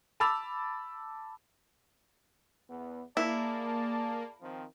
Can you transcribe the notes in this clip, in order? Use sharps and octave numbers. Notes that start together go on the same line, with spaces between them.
A5 B5 D6 E6 A6 F7
E2 B3
A#3 E4 G#4 D5 A5
D#3 F3 C4